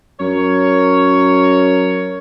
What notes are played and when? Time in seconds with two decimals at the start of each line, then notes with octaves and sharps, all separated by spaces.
0.20 F#2 A#4 C#5